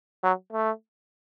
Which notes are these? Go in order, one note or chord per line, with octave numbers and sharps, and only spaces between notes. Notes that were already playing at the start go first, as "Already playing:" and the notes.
F#3
A3